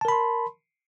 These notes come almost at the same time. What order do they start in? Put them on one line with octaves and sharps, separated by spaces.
A5 A#4 B5 C6